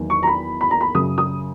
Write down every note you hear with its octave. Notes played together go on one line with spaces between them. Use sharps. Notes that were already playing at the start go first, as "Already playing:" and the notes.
Already playing: E2 D#3 F#3 A#3
C#6
A#5
B5
B5
A#5
B5
F#2 C#3 F#3 D#6
D#6